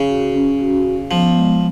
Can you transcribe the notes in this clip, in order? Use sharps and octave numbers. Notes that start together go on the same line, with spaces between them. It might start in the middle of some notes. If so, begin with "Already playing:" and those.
Already playing: C#3
F#4
C#4
F#4
C#4
F3 B3
G#3